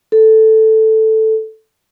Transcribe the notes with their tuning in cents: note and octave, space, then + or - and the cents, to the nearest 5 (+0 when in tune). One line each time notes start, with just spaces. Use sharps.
A4 +0